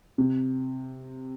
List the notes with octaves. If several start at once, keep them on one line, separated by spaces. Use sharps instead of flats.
C3